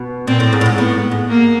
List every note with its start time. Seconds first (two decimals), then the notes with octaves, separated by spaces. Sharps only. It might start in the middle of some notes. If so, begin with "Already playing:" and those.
Already playing: B2
0.27 A#2 C4
0.40 A2
0.53 G#2
0.61 A2
0.66 G#2
0.78 A2 B3
1.11 G#2
1.29 A#3